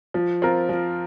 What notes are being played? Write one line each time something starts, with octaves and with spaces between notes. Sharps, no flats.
F3
C4 F4 A#4
F3